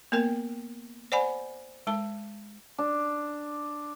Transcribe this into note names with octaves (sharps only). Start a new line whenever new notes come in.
A#3 B3 A#4 G5
C5 D5 F#5 G#5 B5
G#3 A5
D4